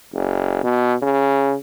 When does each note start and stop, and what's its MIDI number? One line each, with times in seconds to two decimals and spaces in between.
0.14 0.60 30
0.64 0.95 47
1.02 1.55 49